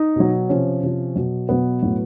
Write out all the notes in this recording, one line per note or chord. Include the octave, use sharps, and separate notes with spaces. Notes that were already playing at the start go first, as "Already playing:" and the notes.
Already playing: D#4
B2 F#3
C3 F3 C#4
C3 F3
B2 F#3
B2 F#3 B3
A2 F#3